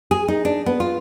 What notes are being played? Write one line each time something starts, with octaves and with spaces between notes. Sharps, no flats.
G#4
D#4
D4
B3
F4